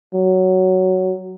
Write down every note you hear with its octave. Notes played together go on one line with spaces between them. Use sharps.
F#3